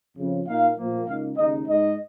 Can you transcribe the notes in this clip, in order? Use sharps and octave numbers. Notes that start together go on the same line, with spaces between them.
F2 C#3 F3
A#2 A#3 D#4 F5
A#2 F3 A#3
C#2 C#3 A#3 D#4 F5
D#2 C#3 G#3 D#4 D#5
G#2 G#3 D#4 D#5